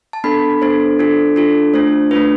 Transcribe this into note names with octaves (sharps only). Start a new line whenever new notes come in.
A5
B3 D4 A4 B5
B3 D4 A4 C5
D4 F4 A4
D4 F4 A4
A3 D4 F4 C5
A3 D4 F4 B4